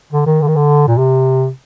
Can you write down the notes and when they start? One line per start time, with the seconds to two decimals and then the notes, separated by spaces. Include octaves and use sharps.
0.13 D3
0.26 D#3
0.41 D3
0.48 D#3
0.56 D3
0.87 A#2
0.98 C3